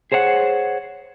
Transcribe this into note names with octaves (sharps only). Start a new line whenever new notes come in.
G#4 C5 C#5 F5 F#5